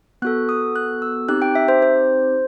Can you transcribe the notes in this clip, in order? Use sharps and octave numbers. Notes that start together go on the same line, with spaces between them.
B3 F#4 A4 F#6
D#6
F#6
E6
C4 D#4 G4 F#6
G5
E5
C5
C5